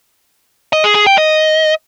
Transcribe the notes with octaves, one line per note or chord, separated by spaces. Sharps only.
D#5
G#4
G#4
G5
D#5